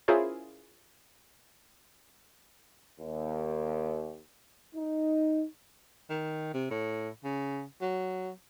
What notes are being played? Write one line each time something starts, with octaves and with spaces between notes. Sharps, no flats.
C#4 E4 F4 G#4 A#4 C5
D#2
D#4
D#3
C3
A2
C#3
F#3